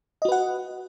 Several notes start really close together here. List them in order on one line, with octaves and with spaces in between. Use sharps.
D#5 F#4 B4 F#5